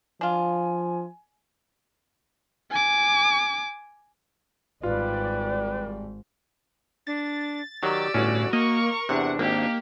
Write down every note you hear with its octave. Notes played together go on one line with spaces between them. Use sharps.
F3 D4 F4 G#5
G#5 D6
G#1 G#2 G3 F4 B4 D5
D4 A6
D#3 F#3 G4 D5 E6
G1 A2 C#4 F#4
A#3 A#4 D#5 C#6
E2 C3 D4 F#5
G#1 A#3 D#4 G4